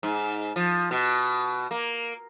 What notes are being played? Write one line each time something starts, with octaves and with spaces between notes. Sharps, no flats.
G#2
F3
B2
A#3